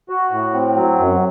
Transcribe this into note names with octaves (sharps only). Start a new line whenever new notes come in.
F#4
A2
C4
F#3
F#2